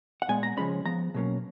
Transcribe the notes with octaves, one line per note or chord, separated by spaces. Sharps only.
F#5
A#2 G#3 B3 G#5
A#5
C#3 F3 G#3 C#4 B5
F3 B3 A#5
B2 F#3 A#3 C#4